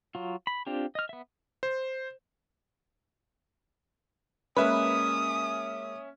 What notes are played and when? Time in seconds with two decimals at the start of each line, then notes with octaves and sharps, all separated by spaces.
0.15 F#3 F4
0.47 B5
0.67 C4 D4 F4 G4
0.95 D#5 F6
1.09 B3 E5
1.63 C5
4.57 G#3 A#3 C#4 B4 E5 D#6